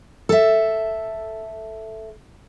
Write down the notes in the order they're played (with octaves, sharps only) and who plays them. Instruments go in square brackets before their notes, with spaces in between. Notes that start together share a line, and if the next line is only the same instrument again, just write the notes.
[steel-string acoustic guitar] A4 E5